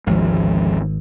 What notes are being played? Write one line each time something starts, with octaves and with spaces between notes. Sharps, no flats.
G#1 D2 F3 G#3